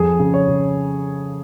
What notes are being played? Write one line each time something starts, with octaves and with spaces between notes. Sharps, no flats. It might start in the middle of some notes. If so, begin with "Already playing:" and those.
Already playing: F2 G#4
C#3
C#5
C#3